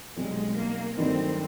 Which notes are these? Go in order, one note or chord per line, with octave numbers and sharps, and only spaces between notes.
B1 B2 G3 G#3 C4
A#3
G2 D#3 F#3 A3 C4